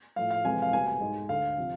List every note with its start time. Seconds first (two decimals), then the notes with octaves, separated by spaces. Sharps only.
0.16 A2 F3 A3 F5
0.31 F5
0.44 F2 C3 E3 G#3 G#5
0.62 F5
0.73 C2 B2 A3 G#5
0.86 G#5
1.01 G#2 G#3
1.29 D2 D3 A3 F5
1.58 C3 F3